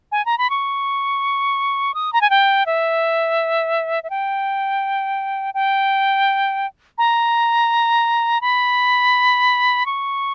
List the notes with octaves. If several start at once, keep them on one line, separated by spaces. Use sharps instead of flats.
G#5
A#5
B5
C#6
D#6
A#5
G#5
G5
E5
E5
G5
G5
A#5
B5
C#6